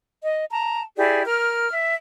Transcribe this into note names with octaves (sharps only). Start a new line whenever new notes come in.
D#5
A5 A#5
E4 G4 G#4 D5
A#4 F6
E5